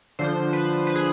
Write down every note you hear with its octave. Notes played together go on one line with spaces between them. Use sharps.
D3 F3 C5
B4
B4
G#4